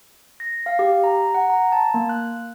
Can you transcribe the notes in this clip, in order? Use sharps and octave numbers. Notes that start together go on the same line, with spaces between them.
A#6
F5
G4
A#5
F#5
A#5
A5
A#3
F#6